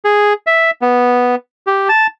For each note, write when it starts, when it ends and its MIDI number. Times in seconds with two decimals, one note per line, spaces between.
0.05 0.33 68
0.47 0.71 76
0.82 1.35 59
1.67 1.88 67
1.89 2.07 81